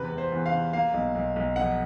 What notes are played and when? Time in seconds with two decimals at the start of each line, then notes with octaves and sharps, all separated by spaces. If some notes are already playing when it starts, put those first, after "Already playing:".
Already playing: E2 C3 B4
0.12 E2
0.18 C5
0.32 E2
0.46 F5
0.52 C3
0.73 A#3 F5
0.94 B1
1.15 B1
1.36 B1
1.56 F1 F#5